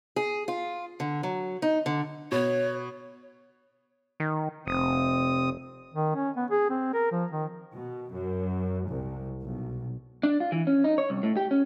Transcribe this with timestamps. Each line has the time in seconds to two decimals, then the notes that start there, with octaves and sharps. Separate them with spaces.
0.16 G#4
0.48 F4
1.00 D3
1.23 F#3
1.62 D#4
1.86 D3
2.32 B2 C#5
4.20 D#3
4.67 F1 C3 C4 D#6
5.94 D#3
6.15 C#4
6.36 B3
6.51 G#4
6.70 C4
6.93 A#4
7.12 F3
7.31 D#3
7.73 B2
8.12 F#2
8.89 C2
9.43 B1
10.23 D4
10.40 F4
10.52 E3
10.67 C#4
10.84 D#4
10.98 C#5
11.10 C2
11.23 A2
11.37 G4
11.51 C#4